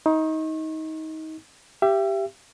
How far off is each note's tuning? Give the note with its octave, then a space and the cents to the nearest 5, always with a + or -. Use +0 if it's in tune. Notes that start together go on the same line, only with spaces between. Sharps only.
D#4 +25 C#6 -35
G4 +0 E5 +35